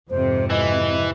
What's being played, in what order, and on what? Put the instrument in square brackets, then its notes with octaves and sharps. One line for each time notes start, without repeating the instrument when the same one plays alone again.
[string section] F2 G#2 C3 [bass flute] C5
[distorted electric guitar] E3 [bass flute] D#5